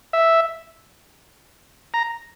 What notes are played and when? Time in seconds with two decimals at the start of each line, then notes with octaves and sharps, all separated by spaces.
0.13 E5
1.94 A#5